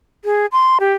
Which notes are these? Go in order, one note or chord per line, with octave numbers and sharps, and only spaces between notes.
G#4
C6
G4